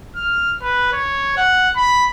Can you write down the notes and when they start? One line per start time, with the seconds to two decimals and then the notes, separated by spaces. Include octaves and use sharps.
0.16 F6
0.62 B4
0.92 C#5
1.37 F#5
1.76 B5